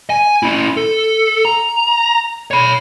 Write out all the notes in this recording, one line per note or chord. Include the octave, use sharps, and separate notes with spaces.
G#5
C#4 E4
A4
A#5
C#5 B5